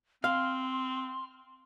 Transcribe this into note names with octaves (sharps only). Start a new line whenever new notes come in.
C4 F5 C6 F6